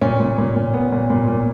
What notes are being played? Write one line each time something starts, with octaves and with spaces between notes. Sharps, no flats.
A#2 C#4
A#2
A#2
A#2
A#2 B3
A#2
A#2
A#2